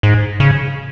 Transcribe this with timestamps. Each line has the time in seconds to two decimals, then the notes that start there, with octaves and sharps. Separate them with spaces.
0.03 G#2
0.40 C#3